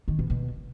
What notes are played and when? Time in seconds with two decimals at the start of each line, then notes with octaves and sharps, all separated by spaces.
0.08 D#3
0.19 B2
0.30 B2